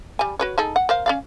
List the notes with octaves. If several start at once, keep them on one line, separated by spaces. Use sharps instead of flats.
G3 G#5
F#4 B4 C#5
D#4 G#4 A4
F#5
A#4 C5 F5
C#4 D5 F5